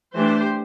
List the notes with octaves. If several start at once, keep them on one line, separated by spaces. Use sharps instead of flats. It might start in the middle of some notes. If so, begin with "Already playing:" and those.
E3 A3 D4 G4 C5